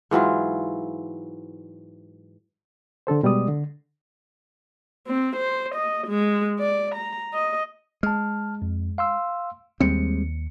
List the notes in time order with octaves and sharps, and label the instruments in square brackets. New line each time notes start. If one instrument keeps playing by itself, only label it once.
[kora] G#2 E3 F#3 F4
[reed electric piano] D3 D4 A4 C5
B2 G3 G#3 D5 D#6
D3
[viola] C4
C5
D#5
G#3
D5
A#5
D#5
[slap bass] G#3 [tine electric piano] A5 F6
[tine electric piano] F2
F5 C6 E6
[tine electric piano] D#2 C#7 [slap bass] G3 G#3 C4